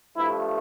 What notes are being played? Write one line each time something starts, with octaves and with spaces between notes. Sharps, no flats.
G2 F3 A3 E4